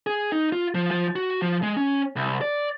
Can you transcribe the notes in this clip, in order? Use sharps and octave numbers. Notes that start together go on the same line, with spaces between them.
G#4
D#4
F4
F3
F3
F#4
F3
G#3
C#4
C2
D5